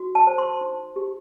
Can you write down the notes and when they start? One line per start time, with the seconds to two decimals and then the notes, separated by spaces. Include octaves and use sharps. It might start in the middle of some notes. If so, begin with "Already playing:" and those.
Already playing: F#4
0.15 A5
0.27 C5
0.38 C6
0.61 D#4
0.96 G4